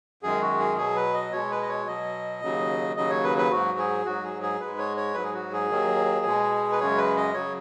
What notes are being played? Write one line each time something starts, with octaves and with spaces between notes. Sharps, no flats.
F#2 D#3 G#3 G#4
F#4
G#4
B2 F#3 G#4
B4
D#5
B2 G#3 C#5
B4
D#5
C#5
B2 F#3 D#5
D#2 C#3 F#3
D#2 C#3 F#3 D#5
C#5
B4
B4
G#2 F#3 F#4
G#4
G#2 F#3 F#4
G#4
G#4
G#2 G#3 B4
C#5
C#5
G#2 F#3 B4
G#4
F#4
G#4
D#2 D#3 F#3
B2 G#3
B4
F#2 C#3 G#3 C#5
B4
D#5
C#3 F#3 C#5